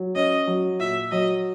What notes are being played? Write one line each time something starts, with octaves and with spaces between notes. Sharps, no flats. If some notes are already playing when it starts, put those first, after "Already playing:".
Already playing: F#3
C#4 D#5
F#3
A#2 E5
F#3 D#5